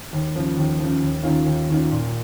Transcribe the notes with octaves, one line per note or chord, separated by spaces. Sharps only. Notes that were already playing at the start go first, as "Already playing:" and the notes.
D#2
C#3 F3
D#2
C#3 F3
D#2
D#3 C#4 F4
D#2
D#3 C#4 F4
A#2